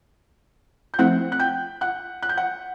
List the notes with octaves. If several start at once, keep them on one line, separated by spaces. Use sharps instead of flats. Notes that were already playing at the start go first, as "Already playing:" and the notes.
G6
F3 A3 C4 E4 F#5 F#6
F#6
G5 G6
F#5 F#6
F#6
G6
F#5 F#6